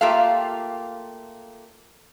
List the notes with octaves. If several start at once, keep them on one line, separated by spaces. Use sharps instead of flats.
A3 A#3 F4 G4 A4 F5